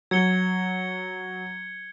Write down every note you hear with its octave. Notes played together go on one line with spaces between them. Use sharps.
F#3 G#6 C#7 G7